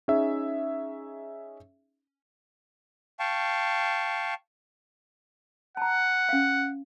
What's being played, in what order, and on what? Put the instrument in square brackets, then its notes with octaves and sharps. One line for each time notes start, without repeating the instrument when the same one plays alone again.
[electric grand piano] C#4 D#4 G#4 E5
[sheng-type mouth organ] F5 G5 A5 C#6
[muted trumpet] F#5 [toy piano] A5 A#5
[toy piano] C#4 F5